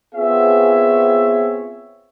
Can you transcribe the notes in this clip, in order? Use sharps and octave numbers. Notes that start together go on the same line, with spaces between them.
B3 C4 F4 G#4 C#5 E5